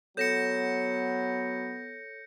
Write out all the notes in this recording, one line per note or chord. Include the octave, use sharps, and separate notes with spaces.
F#3 B3 A4 C#5 G6 A#6 C#7 E7